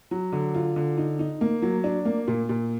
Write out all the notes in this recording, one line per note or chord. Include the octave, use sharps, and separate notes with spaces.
F#3
D3
F4
D3
D#4
D#4
A#3
F#3
D4
A#3
A#2
A#2